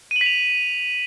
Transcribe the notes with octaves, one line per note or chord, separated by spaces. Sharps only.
D#7
F#7
B6
F7